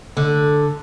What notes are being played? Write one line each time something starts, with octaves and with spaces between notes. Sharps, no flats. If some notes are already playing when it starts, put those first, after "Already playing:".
D3